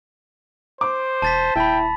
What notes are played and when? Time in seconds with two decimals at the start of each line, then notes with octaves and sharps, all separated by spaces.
0.81 C5 D6
1.22 E1 A5 A6 B6
1.56 D#1 E4 G5 A5 B5